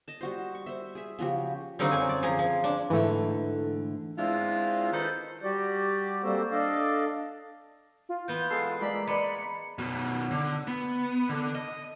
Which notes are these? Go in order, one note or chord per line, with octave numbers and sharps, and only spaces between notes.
D#5 A5
G3 F#4 C5
C#6
C5 E5
G#4 E5
C#3 F3 F#4 G4
D3 G3 C4 D#4 F4 F#4
F#2 G#5
D5
F3 G#4 A#5
F3
D4
G#2 D3 E3 A3
G#3 B3 C4 D4 E4 F4
D#3 D#4 A4 B4 C5
G3 F#4 G4 D5
G3 A#3 C4 F#4 A4 C5
D4 A4 D5 D#5 F5
F4
E3 B3 G6
G#3 A4 C7
G#3 A#3 D5 B5
G#3 B4 D5 B5 C#7
F#2 B2
D3
B3
D3 A4
D#5